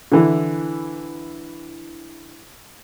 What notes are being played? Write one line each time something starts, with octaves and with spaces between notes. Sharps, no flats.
D3 E3 E4